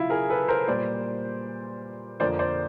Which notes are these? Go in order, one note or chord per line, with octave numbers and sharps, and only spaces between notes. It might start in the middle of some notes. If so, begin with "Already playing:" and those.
Already playing: C#3 F#3 E4 F4
G#4 A#4
A4 B4
A#4 C5
A#2 G3 A#3 C5 D5
F2 D3 F3 A#3 C5 D5
C5 D5